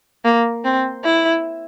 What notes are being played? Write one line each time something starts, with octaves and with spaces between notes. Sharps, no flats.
A#3
C4
E4